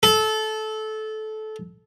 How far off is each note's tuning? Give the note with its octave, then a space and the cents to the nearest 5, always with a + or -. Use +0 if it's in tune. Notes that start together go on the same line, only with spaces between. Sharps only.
A4 -20